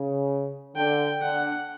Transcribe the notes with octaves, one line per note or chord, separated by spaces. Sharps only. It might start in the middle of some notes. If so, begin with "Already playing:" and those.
Already playing: C#3
D3 G5
D3 F#5